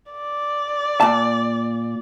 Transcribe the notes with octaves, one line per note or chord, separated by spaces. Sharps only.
D5
A#2 A5